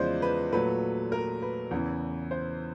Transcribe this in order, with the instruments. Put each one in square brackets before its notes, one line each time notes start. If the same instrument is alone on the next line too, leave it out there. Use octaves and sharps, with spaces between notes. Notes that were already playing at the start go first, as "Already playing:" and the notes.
Already playing: [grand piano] E2 C#3 F3 G#3 C5 D5 D#5
B4
A#2 F#3 A3 B4
A#4
B4
E2 C#3 E3
C5